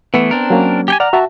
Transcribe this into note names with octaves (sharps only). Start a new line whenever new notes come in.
E3 A3 B3
C4 D4 A#4
F#3 A#3 C#4
G4 G5 G#5
D5 F#5 A#5 F6
F#4 E5 A5